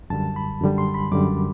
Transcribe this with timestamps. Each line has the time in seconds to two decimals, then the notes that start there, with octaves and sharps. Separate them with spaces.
0.10 F#2 D3 G3 A5
0.36 B5
0.61 F#2 D3 G3
0.78 C6
0.94 B5
1.12 F#2 D3 G3 D6